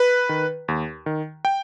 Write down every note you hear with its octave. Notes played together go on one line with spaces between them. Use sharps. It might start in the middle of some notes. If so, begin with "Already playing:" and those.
Already playing: B4
D#3
D#2
D#3
G5